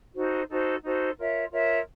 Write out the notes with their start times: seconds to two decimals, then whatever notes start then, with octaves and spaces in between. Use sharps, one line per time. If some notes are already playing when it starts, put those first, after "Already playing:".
0.14 D#4 F#4 A4 C5
0.49 D#4 F#4 A4 C5
0.82 D#4 F#4 A4 C5
1.17 F4 A#4 C#5 E5
1.51 F4 A#4 C#5 E5